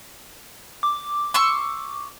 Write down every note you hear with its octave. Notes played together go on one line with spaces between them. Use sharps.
D6
C6 C#6 E6